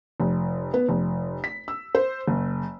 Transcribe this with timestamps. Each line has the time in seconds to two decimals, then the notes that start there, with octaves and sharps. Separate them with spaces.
0.20 F1
0.74 B3
0.89 F1
1.44 B6
1.68 E6
1.95 C5
2.28 F#1